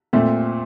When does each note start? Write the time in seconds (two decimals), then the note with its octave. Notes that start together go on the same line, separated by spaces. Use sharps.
0.13 A#2 A3 C4